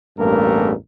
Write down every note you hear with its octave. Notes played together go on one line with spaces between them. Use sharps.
A1 E2 G2 A3 A#3 A#4